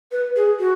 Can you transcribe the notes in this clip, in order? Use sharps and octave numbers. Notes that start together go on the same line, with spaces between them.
B4
G#4
F#4